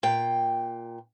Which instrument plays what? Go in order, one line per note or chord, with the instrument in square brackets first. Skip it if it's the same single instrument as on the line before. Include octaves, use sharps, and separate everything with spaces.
[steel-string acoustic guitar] A#2 G5